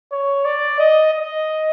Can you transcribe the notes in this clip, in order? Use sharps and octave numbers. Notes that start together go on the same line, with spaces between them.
C#5
D5
D#5
D#5